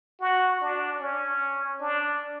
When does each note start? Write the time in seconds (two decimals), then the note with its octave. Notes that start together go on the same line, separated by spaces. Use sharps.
0.21 F#4
0.61 D4
1.00 C#4
1.80 D4